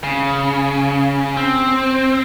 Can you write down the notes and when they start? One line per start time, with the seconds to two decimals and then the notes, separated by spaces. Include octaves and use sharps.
0.04 C#3
1.37 C4